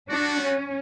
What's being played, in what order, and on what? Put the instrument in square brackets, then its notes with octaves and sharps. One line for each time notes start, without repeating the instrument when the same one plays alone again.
[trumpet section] G3 B3 F#4 [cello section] D4
[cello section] C#4